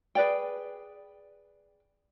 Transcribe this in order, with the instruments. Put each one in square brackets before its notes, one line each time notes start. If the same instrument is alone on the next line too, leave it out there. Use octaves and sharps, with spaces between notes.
[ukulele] G#4 B4 D5 G5